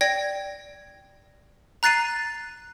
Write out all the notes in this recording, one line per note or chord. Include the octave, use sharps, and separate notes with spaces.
D5 G5 G#6 A#6
A#5 F#6 A6 C7 D#7